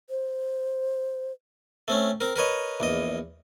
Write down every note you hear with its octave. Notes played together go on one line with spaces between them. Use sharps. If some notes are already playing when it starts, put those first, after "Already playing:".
C5
A3 C4 C#4
C4 A#4
A#4 B4 C#5 D#5
A#1 E2 D#5